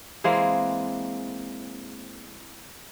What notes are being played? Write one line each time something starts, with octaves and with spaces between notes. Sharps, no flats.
E3 G#3 A#3 C4